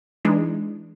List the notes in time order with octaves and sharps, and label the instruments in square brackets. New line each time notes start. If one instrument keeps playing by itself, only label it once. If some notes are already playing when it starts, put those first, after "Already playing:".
[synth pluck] E3 G#3 D4 D#4